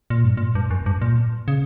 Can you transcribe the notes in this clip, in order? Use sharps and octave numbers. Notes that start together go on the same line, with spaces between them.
A#2
G2
A#2
G2
F#2
G2
A#2
C#3